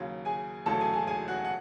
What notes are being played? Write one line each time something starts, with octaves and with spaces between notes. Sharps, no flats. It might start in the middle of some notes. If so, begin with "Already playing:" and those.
Already playing: D#2 C#3 F#3
G#4 G#5
E1 D2 C#3 F#3 A4 A5
G#4 G#5
G#4 G#5
G#4 G#5
F#4 F#5
F#5